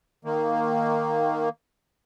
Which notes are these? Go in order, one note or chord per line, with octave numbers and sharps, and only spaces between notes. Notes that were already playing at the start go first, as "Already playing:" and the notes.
D#3 A#3